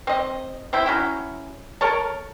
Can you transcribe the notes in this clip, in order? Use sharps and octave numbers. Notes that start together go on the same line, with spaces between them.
C4 D#5
C4 E4 G5
F#3 C#4 E4
A4 A#4 C#5 A5